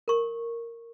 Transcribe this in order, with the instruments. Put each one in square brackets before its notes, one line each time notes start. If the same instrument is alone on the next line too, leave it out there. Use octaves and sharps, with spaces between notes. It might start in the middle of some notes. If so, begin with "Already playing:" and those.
[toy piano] A#4 C#6